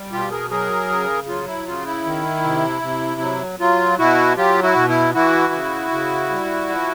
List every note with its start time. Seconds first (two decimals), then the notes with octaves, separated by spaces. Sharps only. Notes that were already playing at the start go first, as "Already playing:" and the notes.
Already playing: G3
0.12 B2 F4 G4
0.31 G#4 A#4
0.50 F#3 G#4 A#4
0.90 C#3
1.28 F#3 F4
1.47 E4
1.66 C#3 F4
1.86 E4
2.05 D#3
2.44 C3
2.82 C3
3.21 F#3
3.59 F#3 F4
3.98 B2 E4 F#4
4.37 F#3 F4 G4
4.63 E4 F#4
4.76 B2
4.88 E4
5.14 E3 E4 F#4
5.53 C#3
5.91 C#3
6.30 G3
6.69 F3